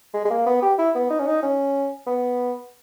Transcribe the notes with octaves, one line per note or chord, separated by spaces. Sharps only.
G#3
G#3
A#3
B3
G4
E4
B3
D#4
C#4
D#4
C#4
B3